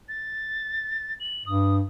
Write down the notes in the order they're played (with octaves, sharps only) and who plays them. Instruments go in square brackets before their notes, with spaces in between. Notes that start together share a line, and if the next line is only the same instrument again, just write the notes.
[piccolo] A6
F#7
[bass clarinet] G2 [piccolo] D#6